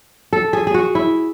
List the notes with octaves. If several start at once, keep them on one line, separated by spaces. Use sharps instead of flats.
A4
G#4
G#4
F#4
E4